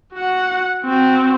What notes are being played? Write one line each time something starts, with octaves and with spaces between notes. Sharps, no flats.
F#4 F#5
C4 F#4